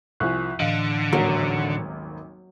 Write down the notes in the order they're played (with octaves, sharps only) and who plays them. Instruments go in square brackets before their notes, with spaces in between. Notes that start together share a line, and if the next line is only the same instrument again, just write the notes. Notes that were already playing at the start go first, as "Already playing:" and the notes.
[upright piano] C2 F3 G#5 [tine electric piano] C#6 F#6
[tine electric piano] A2 E3 [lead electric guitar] D3 [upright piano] D#5 F5
[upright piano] D#1 G#1 A#3 [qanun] F#3